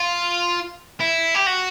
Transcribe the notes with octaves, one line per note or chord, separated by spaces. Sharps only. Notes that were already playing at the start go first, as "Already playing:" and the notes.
Already playing: F4
E4
G4
F#4